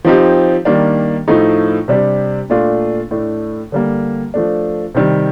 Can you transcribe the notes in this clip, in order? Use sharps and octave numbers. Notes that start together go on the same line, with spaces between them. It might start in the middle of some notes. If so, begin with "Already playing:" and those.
F3 C4 D#4 G4
D#3 G3 A#3 D4
A2 F3 A3 D#4
C3 G3 D4 G4
A#2 A3 D4 F4
A2 A3 D4
D3 G3 A#3
F3 A3 D4
C3 D#3 G3